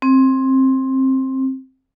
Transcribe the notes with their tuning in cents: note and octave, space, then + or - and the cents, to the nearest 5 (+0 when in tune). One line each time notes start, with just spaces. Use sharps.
C4 +15